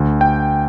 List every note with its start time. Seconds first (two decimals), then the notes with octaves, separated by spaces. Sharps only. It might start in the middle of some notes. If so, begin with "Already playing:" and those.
Already playing: D2
0.21 G5